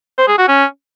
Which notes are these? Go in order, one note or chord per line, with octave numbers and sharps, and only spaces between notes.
C5
G#4
F#4
C#4